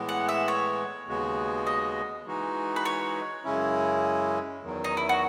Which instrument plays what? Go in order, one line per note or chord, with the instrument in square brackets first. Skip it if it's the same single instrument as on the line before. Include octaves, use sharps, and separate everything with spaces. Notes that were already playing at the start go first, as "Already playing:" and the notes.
Already playing: [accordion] A2 E3 G#3 B3
[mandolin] F#5
E5
C#5
[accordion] D#2 C#3 G#3 B3 F#4
[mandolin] D#5
[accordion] E3 G#3 D#4 F#4
[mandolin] B4
C#5
[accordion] F#2 C#3 G#3 C#4 E4
E2 D#3 F#3
[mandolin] D#4
E4
F#4